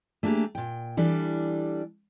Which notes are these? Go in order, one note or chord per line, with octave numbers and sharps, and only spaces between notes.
A3 A#3 D4 F4 G4 G#4
A#2 G5
E3 G3 D4 A4